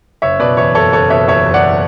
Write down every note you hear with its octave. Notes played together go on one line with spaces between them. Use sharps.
F#1 C#5 E5
B2 B4 D5
E2 C#5 E5
F#1 A4 C#5
F#1 A4 C#5
B2 C#5 E5
E2 C#5 E5
F#1
D5 F#5